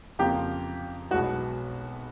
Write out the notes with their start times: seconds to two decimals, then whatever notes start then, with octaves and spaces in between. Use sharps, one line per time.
0.19 F2 C#3 F3 A#3 G4
1.11 B1 B2 G#3 B3 F#4